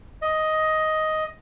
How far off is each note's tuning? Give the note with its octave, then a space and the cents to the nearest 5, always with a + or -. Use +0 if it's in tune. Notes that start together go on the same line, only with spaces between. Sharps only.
D#5 +10